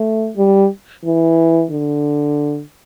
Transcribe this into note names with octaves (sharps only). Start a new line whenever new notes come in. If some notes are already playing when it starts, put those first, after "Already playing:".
Already playing: A3
G3
E3
D3